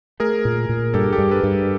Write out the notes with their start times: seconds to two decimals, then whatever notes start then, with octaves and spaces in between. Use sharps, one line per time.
0.20 A3 G#4 A#4
0.45 A#2
0.69 A#2
0.94 G2 G4 A4
1.12 G4 A4
1.18 G2
1.31 A4 B4
1.43 G2